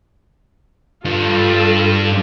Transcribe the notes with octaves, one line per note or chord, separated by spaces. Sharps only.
G2 F4 A4